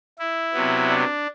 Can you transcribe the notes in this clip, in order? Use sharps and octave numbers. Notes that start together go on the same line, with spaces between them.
E4
C3 F#3 B3
D4